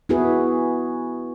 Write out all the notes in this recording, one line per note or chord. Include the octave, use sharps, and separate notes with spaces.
B3 E4 F#4 G#4 B4